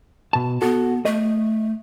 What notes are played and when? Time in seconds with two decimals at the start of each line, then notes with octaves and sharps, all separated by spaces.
0.33 B2 A5
0.62 B3 F#4 A4
1.05 A3 D#5